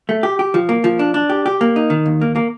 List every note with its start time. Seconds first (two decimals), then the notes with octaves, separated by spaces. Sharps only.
0.09 A3
0.23 G4
0.39 G4
0.54 F3
0.69 A#3
0.84 F3
0.99 D4
1.14 D4
1.29 G4
1.46 G4
1.61 A#3
1.76 D#4
1.90 D#3
2.06 D#2
2.21 A#3
2.36 A#3